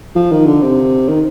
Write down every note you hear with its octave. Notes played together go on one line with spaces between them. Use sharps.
F3
D#3
D3
C3
D#3